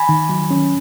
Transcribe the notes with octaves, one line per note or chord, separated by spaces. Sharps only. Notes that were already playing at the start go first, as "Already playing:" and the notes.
Already playing: G#5 B5
D#3
F#3
C#4